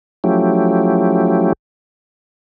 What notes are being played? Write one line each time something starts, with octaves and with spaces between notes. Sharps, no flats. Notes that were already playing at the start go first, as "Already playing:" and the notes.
F3 F#3 A3 C#4 E4 G4